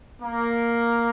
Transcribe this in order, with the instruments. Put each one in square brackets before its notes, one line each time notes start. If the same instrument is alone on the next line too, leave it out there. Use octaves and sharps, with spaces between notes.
[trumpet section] A#3